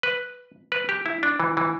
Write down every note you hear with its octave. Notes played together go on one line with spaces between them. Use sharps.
B4
B4
G4
E4
D4
E3
E3